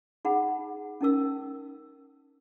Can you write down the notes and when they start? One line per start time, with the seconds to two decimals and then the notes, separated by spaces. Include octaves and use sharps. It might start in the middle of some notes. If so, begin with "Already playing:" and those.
0.25 D#4 G#4 F#5 B5
1.01 C#4 D#4 A#4 E6